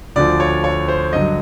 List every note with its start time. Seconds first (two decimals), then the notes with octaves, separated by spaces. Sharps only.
0.16 D2 D3 F3 D5
0.40 C#5
0.64 C#5
0.88 C5
1.13 G2 D3 F#3 D#5